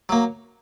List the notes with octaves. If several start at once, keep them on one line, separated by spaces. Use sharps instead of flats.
F#3 A#3